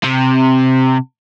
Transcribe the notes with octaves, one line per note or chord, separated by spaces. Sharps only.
C3